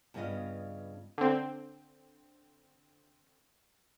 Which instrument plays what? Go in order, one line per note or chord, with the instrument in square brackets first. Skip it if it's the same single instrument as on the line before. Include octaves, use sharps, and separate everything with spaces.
[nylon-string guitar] G2 C#3 B3 F4 D#5
[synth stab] D3 C4